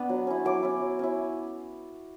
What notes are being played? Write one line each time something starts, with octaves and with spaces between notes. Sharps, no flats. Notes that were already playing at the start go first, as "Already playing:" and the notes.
Already playing: B3 D4
F#3
C#4 E4
F#3 D6
C#4 E4
F#3
C#4 E4